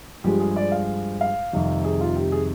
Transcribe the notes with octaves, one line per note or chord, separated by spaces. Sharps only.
G2 F3 G#3 G4
G#4
D5
F5
F5
F2 C3 D#3 G3
G#4
F4
G4
G#4